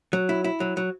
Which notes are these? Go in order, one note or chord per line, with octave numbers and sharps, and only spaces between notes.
F#3
E4
E4
F#3
F#3